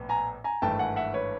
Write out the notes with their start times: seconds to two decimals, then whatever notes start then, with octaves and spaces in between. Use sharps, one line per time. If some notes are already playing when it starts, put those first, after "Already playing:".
Already playing: A#1 A2 B3
0.09 G#5 A#5
0.44 G#5 A#5
0.62 G#1 G2 E3 A3 G5 A5
0.79 F#5 G#5
0.96 E5 F#5
1.14 B4 C#5